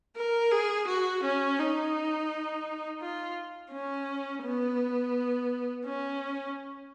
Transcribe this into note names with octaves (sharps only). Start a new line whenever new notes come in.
A#4
G#4
F#4
C#4
D#4
F4
C#4
B3
C#4